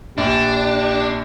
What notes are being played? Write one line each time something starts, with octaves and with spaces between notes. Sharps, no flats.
A#1 D4 G4 E7